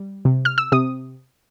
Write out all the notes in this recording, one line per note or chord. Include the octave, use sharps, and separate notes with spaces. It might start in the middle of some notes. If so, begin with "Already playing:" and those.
Already playing: G3
C3
F6
E6
C3 D#6